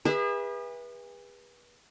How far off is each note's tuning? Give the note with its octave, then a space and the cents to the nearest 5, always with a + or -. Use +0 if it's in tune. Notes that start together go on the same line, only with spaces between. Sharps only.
G#4 -40 B4 -25 E5 +0